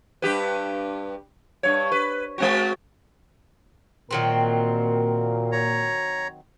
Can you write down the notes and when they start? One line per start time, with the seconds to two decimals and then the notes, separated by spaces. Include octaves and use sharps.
0.22 G2 G4 B4
1.63 G2 C#5
1.92 B4
2.38 G#3 C4 F#4
4.11 A#2 D#3 F#3 C4 A#4
5.52 C#5 A#5